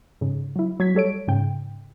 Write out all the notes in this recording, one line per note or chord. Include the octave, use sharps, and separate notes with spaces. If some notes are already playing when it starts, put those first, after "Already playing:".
G#2 C#3
F#3 E4
F#3 G#6 B6
G3 A4 C#5 D7
G#2 C#3 G5